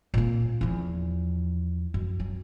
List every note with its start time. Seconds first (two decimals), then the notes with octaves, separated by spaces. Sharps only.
0.14 A#2 A#3
0.61 E2 F3
1.94 F#2
2.20 F#3